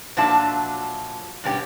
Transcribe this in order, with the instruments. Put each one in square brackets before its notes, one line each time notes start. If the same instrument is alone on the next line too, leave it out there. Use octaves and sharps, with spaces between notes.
[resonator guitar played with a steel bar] A#2 F3 F#3 D4 E5 A5
G2 B2 G3 C#4 G4